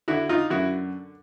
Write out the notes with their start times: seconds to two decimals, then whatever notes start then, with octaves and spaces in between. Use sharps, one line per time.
0.08 D3 E4 F#4
0.29 D#4 F4
0.50 F#2 E4 F#4